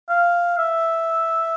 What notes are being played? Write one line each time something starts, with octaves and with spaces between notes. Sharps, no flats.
F5
E5